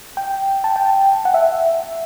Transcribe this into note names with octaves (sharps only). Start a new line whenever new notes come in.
G5
A5
G5
F#5
E5